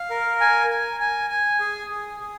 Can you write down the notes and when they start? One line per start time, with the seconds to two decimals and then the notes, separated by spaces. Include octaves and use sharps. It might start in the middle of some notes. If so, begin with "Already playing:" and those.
Already playing: F5
0.10 A#4
0.41 G#5
0.70 G#5
1.00 G#5
1.30 G#5
1.60 G#4
1.90 G#4
2.20 G#4